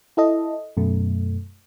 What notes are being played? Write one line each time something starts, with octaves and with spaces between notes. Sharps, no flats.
E4 A4 D#5
F#2 B2 A3